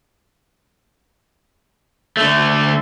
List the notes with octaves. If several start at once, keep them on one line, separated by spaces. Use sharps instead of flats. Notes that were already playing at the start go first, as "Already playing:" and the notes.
D3 A3